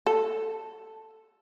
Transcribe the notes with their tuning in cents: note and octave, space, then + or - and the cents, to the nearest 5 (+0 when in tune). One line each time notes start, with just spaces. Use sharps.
A4 +5